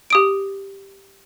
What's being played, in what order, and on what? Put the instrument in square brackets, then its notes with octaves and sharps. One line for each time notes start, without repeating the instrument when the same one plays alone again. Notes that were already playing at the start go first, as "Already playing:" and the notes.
[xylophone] G4 D#6 D7